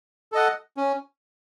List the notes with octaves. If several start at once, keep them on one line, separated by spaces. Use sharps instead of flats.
A4 D#5 F#5
C#4